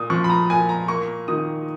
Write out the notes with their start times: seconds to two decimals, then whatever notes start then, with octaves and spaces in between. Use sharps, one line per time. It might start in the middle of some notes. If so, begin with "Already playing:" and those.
Already playing: A#2 D#6
0.10 F3 C#6
0.24 B5
0.30 A#5
0.50 A#2 G#5
0.69 A#5
0.88 A#3 C#6
1.28 D#3 D#6